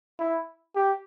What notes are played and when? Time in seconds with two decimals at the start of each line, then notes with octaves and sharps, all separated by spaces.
0.19 E4
0.76 G4